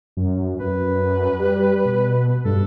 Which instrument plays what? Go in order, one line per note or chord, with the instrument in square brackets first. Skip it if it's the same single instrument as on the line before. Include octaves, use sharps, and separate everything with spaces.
[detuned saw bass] F#2
[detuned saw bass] F#2 [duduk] B4
[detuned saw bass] G3
B2
[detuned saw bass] G2 [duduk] A4